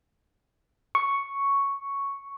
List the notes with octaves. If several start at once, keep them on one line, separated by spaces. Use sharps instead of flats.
C#6